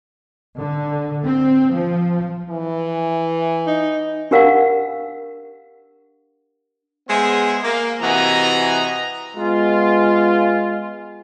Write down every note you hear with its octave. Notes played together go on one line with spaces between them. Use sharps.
D3
C4
F3
E3
D#4
D4 G4 A#4 F5 F#5
G#3 B3 G#4 C5 E5
A#3
C3 E3 F#4 D#5 A#5
G#3 B3 F4